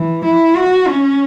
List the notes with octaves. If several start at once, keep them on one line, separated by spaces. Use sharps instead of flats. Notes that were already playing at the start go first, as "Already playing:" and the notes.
Already playing: E3
E4
F#4
C#4